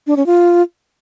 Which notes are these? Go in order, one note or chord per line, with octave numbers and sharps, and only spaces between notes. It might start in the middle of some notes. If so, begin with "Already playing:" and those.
D4
C#4
F4